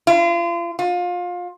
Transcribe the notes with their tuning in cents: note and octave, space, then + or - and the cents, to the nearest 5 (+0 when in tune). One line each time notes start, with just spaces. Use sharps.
F4 -35
F4 +25